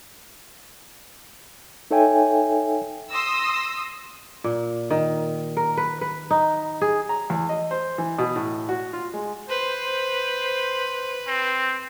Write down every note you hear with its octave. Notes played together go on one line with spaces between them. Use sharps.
D#4 A4 C#5 E5 G5 G#5
C6 D#6 E6 A#6
A#2
D#3
A#4
B4
B4
D#4
G#4
A#5
E2
D#5
C5
E3
B2
A2
F#4
F4
G#3
B4 C5
C4